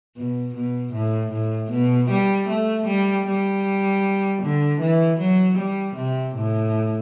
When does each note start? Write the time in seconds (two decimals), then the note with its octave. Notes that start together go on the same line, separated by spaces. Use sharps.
0.16 B2
0.55 B2
0.94 A2
1.33 A2
1.72 B2
2.10 G3
2.49 A3
2.87 G3
3.27 G3
4.42 D3
4.81 E3
5.20 F#3
5.58 G3
5.96 C3
6.36 A2